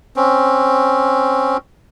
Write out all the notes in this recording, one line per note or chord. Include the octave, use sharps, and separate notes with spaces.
C4 C#4